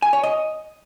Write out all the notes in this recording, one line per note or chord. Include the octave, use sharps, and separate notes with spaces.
G#5
C#5
D#5